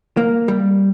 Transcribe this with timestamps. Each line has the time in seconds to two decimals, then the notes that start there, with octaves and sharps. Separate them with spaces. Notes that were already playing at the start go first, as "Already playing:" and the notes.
0.17 A#3
0.48 G3